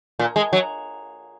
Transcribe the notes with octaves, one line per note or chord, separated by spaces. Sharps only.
A#2
G#3
F#3